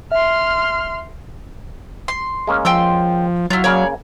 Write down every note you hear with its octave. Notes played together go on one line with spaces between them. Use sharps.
E5 C6 F6
C6
G#3 A#3 C#4
F3 G5 C6 E6
F#3 E4 F4
C#3 A#3 C#5 D5